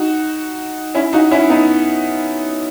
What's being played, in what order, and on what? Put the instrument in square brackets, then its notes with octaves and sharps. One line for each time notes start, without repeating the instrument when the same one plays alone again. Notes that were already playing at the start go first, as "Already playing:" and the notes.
Already playing: [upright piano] D#4 F#4
C#4 E4
D#4 F#4
C#4 E4
B3 D#4